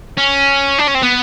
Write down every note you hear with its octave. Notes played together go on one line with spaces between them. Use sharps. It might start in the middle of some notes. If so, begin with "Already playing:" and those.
C#4
D4
C#4
C4
B3